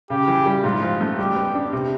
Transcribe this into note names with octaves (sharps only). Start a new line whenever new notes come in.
C#3 G4
E3
G3
G#2 F4
F3
A3
G3 G4
B3
D4
C3